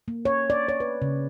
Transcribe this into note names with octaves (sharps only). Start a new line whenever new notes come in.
A#3
C#5
D5
C#5
B4
C#3